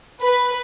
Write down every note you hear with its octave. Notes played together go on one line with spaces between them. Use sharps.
B4